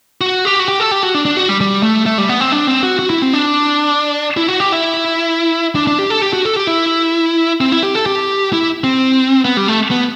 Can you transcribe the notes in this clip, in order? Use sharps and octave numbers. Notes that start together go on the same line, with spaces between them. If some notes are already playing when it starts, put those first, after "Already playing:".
F#4
G4
F#4
G4
A4
G4
F#4
D4
D4
F#4
G3
G3
A3
A3
G3
B3
C4
D4
C4
F#4
F#4
E4
C4
D4
E4
F#4
G4
E4
D4
D4
G4
A4
G4
F#4
A4
G4
E4
C4
E4
G4
A4
G4
E4
C4
B3
G3
A3
B3